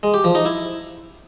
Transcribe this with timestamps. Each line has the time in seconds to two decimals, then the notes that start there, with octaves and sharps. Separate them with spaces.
0.03 G#3
0.14 G4
0.24 F3
0.35 D#4
0.45 E4